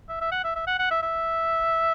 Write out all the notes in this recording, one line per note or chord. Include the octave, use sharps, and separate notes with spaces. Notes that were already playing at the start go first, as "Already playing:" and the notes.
E5
E5
F#5
E5
E5
F#5
F#5
E5
E5